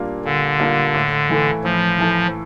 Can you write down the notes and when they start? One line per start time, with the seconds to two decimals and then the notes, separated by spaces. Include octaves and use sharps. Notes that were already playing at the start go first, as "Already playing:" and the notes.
Already playing: A#2 G3 A#3 D4 F4
0.25 A#2 D3
0.59 G3 A#3 D4 F4
0.94 A2
1.29 E3 A3 E4 A4
1.64 A2 F3
1.98 E3 A3 E4 A4